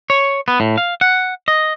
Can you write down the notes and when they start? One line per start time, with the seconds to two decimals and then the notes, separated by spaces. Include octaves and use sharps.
0.10 C#5
0.48 B3
0.60 A2
0.78 F5
1.01 F#5
1.48 D#5